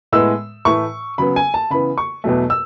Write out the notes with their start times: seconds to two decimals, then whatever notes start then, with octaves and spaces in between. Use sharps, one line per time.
0.12 A2 G#3 B3 E6
0.65 A2 E3 A3 C#6
1.18 C#3 F#3 B3 B5
1.36 G#5
1.54 A5
1.70 C#3 E3 B3 B5
1.98 C#6
2.24 E2 B2 F#3 A3
2.50 E6